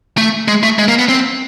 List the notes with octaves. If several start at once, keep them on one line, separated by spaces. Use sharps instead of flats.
A3
G#3
A3
G#3
A#3
B3
C4